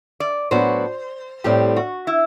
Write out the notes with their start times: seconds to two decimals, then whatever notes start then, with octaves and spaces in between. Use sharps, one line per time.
0.20 D5
0.51 A2 F#3 B3 D4 F#4 C5
1.44 A2 G3 C4 G4
1.76 F#4
2.07 E4